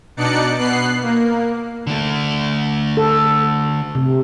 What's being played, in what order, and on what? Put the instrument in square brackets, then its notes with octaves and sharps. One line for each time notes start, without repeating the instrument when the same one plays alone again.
[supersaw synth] B2 D4 D#4 D5 F#6 C#7
B2 B3 F#6 C7
A#3
[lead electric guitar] D3 A3
[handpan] A4
C3